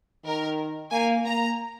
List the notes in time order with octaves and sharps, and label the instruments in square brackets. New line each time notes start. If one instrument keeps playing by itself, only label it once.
[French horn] D#3 [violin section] A#4
[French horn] A#3 [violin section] G#5
[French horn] A#3 [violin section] A#5